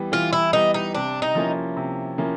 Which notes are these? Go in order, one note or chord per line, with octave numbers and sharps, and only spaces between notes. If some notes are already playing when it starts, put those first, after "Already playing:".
Already playing: E3 G3 B3
E3 F4
E4
G3 B3 D#4
D#4
C3 D4
D#4
F3 A#3 C#4 E4
C3
F3 A#3 C#4 E4